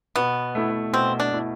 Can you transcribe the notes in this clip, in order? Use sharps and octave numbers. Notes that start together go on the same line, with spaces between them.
B2 B3
A3 E4
B2 C4
D4
A3 E4